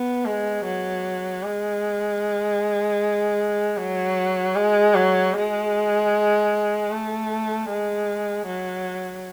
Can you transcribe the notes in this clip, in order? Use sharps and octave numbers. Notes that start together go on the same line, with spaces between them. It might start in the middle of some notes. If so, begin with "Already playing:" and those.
Already playing: B3
G#3
F#3
G#3
F#3
G#3
F#3
G#3
A3
G#3
F#3